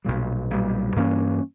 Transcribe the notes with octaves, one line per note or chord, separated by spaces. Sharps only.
B1 A#2 G3
B1 A#2 G3
G2 E3 A#3 C#4